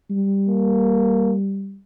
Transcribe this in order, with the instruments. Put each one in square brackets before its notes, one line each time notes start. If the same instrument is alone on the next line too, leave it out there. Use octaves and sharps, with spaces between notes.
[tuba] G3
[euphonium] A#3